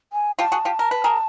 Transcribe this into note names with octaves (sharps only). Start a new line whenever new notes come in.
G#5
F4 G4 A5
F#4 G#4
F4 G4
A#4
B4
G#4 A#4